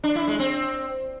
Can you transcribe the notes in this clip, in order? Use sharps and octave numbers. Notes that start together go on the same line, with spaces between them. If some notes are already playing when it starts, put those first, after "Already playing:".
D4
E4
G#3
C4